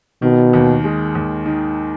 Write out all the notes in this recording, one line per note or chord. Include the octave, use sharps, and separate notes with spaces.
B2 D#3
D#2
G#3
D#2
D#3